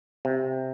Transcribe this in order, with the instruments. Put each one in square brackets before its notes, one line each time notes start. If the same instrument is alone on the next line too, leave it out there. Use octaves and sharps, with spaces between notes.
[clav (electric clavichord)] C3